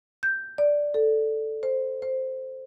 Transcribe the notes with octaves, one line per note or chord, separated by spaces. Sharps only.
G6
D5
A4
C5
C5